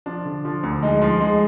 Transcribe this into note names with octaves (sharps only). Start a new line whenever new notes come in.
F3 D4
D3
F3
D2
G#3 D#4
F3
G#3